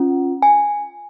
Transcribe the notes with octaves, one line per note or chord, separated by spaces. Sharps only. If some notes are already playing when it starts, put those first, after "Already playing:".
Already playing: C#4 F4
G#5